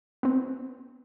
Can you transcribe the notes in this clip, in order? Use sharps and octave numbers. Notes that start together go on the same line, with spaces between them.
B3 C4